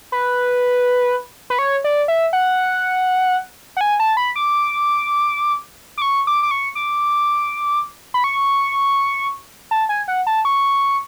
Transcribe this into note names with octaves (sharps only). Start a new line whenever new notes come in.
B4
B4
C#5
D5
E5
F#5
F#5
G#5
A5
B5
D6
D6
C#6
D6
D6
C#6
D6
B5
C#6
A5
G#5
F#5
A5
C#6